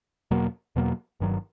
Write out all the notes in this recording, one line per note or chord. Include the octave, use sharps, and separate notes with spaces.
E2 B2 F#3 A#3
E2 B2 F#3 A#3
G1 G2 D#3 F#3